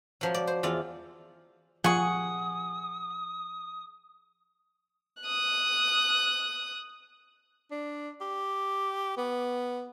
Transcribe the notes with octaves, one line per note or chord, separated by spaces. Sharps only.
F3 F#3
D5
C5
E2 F4 D5
F3 G#4 F#5 C#6 D#6
D#6 F#6
D4
G4
B3